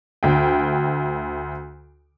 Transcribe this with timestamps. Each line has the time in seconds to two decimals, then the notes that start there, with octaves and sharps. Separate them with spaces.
0.23 D2 G5